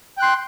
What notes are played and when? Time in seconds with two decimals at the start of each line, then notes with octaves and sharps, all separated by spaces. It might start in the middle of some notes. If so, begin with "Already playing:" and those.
0.17 G5
0.20 F#6
0.23 C6